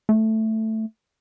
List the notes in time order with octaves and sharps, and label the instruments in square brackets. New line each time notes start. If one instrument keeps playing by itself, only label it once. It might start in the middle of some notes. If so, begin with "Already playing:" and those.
[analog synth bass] A3